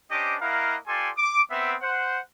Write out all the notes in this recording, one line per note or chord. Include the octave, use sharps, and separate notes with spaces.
C#4 D4 G4 C5 D#5 D6
A#3 E4 A#4 D#5 F5 F#5
F4 G4 A4 D5 G#5 C6
D6
B3 C4 E5
C5 F#5